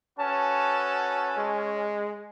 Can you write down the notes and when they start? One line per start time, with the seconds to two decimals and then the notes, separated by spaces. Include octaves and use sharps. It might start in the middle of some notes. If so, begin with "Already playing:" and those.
0.19 C#4 F#4 A4 B4 A5
1.37 G#3